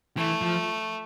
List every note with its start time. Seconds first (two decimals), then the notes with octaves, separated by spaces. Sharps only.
0.17 E3 A3
0.42 F3